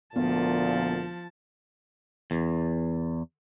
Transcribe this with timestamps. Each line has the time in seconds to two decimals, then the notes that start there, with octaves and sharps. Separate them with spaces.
0.16 D2 A#2 F3 B3 A5
2.31 E2